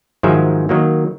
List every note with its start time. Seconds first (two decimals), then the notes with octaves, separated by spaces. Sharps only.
0.23 G#2 D#3 F3 F#3 G#3 E5
0.69 D#3 F#3 A#3